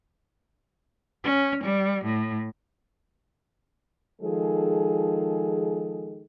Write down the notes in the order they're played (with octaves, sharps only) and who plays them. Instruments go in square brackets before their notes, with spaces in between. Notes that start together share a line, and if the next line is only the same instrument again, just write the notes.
[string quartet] C#4
G3
A2
[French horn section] D#3 F3 G#3 G#4 A4